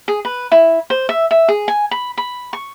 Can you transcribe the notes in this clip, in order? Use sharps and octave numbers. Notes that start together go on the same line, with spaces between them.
G#4
B4
E4
C5
E5
E5
G#4
G#5
B5
B5
C#6